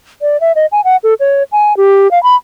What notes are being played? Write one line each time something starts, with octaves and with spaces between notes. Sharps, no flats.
D5
E5
D#5
G#5
F#5
A4
C#5
G#5
G4
F5
B5